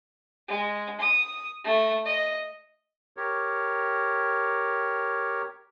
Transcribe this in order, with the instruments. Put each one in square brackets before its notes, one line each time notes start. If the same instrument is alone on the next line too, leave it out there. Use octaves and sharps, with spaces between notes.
[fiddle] G#3
D#6
A3
D#5
[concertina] G4 A#4 C#5